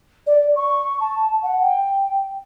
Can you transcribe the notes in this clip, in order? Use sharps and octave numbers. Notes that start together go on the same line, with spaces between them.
D5
C#6
A5
F#5
G5